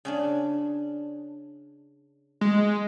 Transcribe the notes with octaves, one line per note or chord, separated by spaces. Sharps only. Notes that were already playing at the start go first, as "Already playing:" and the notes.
C#3 C#4 D4
G#3